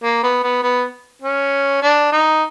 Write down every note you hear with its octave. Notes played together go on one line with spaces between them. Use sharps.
A#3
B3
B3
B3
C#4
D4
D#4